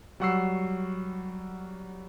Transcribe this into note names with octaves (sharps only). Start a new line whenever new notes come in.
F#3 G3 F#5 C#6 E6 C7